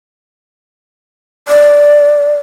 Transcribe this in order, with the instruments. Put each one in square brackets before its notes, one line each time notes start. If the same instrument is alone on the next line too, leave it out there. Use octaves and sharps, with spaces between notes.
[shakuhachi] D5